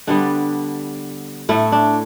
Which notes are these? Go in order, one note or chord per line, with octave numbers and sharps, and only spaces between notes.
D3 G3 B3 D4
A2 A3 E4
D4